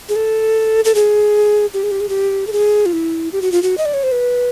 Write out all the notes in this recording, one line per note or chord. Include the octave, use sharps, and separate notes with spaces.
G#4
A4
A4
G#4
G4
G#4
G4
G#4
G4
A4
G#4
F4
E4
G4
F#4
F4
F#4
D#5
D5
C#5
C5
B4